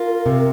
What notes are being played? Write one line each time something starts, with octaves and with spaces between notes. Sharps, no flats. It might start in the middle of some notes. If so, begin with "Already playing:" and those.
Already playing: F4 A#4
C3